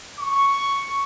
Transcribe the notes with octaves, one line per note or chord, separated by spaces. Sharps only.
C#6